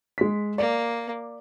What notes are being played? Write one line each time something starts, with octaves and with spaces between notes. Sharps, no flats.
G#3 B6
A#3 D5